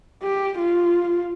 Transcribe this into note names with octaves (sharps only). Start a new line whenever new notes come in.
G4
F4